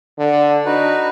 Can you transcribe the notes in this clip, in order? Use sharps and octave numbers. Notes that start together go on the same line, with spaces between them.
D3
D4 D#4 F#4 B4